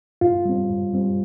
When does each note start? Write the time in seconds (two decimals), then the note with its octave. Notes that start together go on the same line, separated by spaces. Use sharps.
0.21 G2 F4
0.45 G3 C4
0.69 G2
0.93 G3 C4